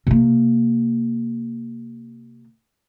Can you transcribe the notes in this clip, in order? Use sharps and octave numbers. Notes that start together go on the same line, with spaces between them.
C3 A#3